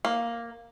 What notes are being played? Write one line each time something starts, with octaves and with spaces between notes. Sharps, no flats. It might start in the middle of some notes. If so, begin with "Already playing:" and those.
A#3